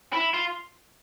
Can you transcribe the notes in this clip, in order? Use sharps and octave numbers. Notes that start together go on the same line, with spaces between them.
E4
F4